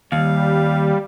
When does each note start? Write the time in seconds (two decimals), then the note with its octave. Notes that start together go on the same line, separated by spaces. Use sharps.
0.12 D#2 G3 F5